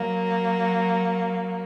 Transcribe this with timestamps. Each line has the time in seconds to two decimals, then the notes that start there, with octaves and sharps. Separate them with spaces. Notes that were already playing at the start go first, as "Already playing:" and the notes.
Already playing: F#3 A#3